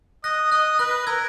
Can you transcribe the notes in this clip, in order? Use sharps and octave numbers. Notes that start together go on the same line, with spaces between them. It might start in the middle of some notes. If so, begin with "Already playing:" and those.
D#5 F#6 A#6
D#5 F#6
B4 F#6 A#6
A#4 E6 G#6